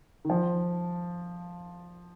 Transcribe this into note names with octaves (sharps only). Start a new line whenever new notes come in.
D#3
F3